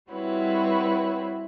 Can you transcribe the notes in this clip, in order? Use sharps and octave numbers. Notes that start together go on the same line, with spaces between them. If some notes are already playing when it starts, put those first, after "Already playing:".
G3 C4 E4 F#4 B4 C#5